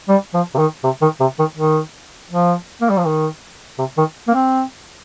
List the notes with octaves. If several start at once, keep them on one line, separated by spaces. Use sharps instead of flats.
G3
F3
C3
D#3
C3
D#3
C3
D#3
D#3
F3
A#3
G3
F3
D#3
C3
D#3
A#3
C4